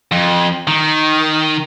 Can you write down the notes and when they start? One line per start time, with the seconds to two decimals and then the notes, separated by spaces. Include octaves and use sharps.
0.11 F2
0.68 D#3